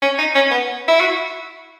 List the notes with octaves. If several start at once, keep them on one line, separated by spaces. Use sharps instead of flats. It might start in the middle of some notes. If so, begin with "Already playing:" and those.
C#4
D#4
C#4
B3
E4
F#4